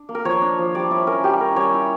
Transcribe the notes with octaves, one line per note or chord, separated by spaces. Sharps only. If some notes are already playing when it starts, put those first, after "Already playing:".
Already playing: D4
A#3
A#4
F3 C#5
D4
F3
G3 D5
E4 C#5
C#4 A#4
G3 G4
C#4 A#4
G3 C#5
E4